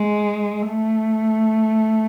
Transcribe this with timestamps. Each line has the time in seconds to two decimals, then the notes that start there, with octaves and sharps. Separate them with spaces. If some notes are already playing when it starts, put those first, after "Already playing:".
Already playing: G#3
0.67 A3